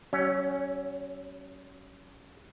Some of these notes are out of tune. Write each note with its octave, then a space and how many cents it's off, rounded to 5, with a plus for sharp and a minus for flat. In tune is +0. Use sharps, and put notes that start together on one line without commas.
F#3 +35 C#4 +0